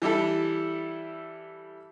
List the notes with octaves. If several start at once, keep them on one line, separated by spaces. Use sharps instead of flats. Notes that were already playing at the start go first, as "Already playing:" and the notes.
E3 G3 E4 A4